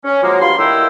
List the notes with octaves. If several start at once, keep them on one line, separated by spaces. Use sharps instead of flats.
C#4
F3 F#3 G#3 A#3
G2 F4 B5 C6
A2 D#3 A#3 E4 G5 E6